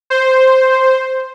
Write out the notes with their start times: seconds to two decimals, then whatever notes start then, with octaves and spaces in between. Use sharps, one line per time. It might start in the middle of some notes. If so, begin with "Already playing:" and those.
0.10 C5